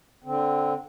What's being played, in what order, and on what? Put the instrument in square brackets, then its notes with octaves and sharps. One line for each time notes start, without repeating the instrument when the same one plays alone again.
[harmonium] D3 C4